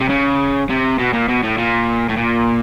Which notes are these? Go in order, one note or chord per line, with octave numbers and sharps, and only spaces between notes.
C3
C#3
C3
B2
A#2
B2
A2
A#2
A2
A#2